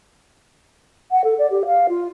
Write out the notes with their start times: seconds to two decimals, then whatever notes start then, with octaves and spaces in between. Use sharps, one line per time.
1.11 F#5
1.24 A4
1.39 D5
1.51 G4
1.66 F5
1.89 F4